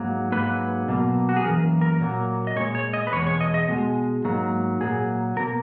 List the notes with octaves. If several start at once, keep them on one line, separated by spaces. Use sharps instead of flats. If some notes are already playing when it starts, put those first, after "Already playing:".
Already playing: G#2 F#3 A#3
G#2 F#3 A#3 B4
B2 F#3 A#3
F#4
G#4
F#2 E3 A#3 A#4
A#4
A#2 F#3 A#3
D#5
A#2 G#3 C#5
C#5
D#5
B4
E2 B2 G#3 C#5
C#5
D#5
D#5
B2 G#3
G#2 F#3 A#3
A#2 F#3 A#3 G#4
B2 A#3 A#4